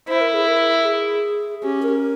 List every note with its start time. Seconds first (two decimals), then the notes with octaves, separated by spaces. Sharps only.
0.08 E4 C5
0.21 A#4
0.34 G#4
0.48 A#4
0.85 G#4
1.63 C#4 G4
1.83 A#4